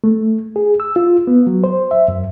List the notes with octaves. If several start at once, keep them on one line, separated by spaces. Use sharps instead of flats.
A3
G#4
E6
F4
B3
F#3
C5
E5
F#2